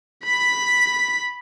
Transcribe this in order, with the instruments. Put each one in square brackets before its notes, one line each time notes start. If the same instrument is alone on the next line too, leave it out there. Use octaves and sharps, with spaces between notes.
[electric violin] B5 B6